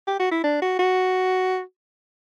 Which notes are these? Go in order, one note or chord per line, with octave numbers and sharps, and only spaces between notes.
G4
F#4
E4
D4
F#4
F#4